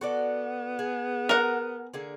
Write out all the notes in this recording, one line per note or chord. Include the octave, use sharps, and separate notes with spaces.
B3 F#4 A4 D5
G#4
A#4 F#5
D3 A#3 G#4